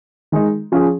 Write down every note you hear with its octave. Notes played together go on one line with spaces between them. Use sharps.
D#3 G#3 D#4
F3 C#4 G#4